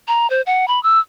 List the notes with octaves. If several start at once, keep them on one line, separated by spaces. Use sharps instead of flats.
A#5
C5
F#5
B5
E6